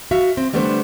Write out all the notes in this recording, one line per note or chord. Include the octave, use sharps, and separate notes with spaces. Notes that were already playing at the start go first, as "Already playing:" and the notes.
F#4 E5 F5
C4
D3 G3 A3 B3 D4 C5